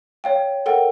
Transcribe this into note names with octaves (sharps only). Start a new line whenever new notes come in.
C#5 F5 G5
A4 A#4 F#5 G5